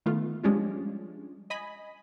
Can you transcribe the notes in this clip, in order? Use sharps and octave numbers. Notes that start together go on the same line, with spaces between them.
D#3 A3 B3 F4
F3 G3 G#3 C#4 D4 F4
D#5 G#5 B5